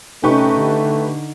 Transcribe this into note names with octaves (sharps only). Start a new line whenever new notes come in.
C3 A3 C#4 D#4 G4 B4 C#6
D3